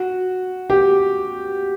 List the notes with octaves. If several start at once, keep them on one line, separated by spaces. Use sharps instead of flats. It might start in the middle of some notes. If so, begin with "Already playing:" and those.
Already playing: F#4
G4